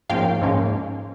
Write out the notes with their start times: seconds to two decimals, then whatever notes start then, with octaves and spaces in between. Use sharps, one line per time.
0.10 G#2 F3 A#3 C#4 F5 G5
0.42 G#2 F3 A#3 C#4